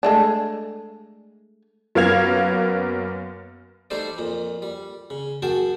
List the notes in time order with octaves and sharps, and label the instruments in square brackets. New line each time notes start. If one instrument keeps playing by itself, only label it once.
[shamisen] G#3 A3 D4
[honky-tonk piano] F#2 A#3 B3 F5 G#6 F7
[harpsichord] G3 A3 C4 D#4 C5 D5
F2 A#2
G3
C#3
F#2 F#4 G#4 G5 A5